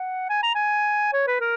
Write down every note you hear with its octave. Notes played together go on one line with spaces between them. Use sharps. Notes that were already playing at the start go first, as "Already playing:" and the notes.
Already playing: F#5
G#5
A#5
G#5
C#5
B4
A#4